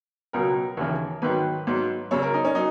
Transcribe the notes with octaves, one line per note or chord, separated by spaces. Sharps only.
C#2 B2 F#3 A#4
D#2 C#3 E3
G#2 D#3 F#3 B4
G#2 F#3
F#2 C#3 F#3 C#5
A#4
D#4
C#4
F#3 D#4